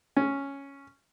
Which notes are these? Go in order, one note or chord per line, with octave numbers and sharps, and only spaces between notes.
C#4